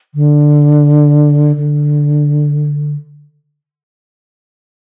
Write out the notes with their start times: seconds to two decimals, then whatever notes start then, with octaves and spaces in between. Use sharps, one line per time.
0.15 D3
1.56 D3